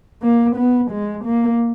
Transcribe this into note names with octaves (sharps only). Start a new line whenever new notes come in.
A#3
B3
G#3
A#3